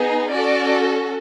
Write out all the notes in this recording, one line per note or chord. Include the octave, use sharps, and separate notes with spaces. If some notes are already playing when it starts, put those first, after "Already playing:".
Already playing: B3 D#4 G#4
C#4 F#4 A4 D5